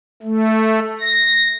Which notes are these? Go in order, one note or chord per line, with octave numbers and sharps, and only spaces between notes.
A3
A#6